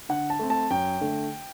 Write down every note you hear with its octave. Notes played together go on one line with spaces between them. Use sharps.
D3 F#5
A5
A3 C4
A5
F#2 G5
D3 A3